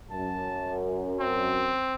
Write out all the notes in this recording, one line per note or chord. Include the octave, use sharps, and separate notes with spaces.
F#2 A5
C4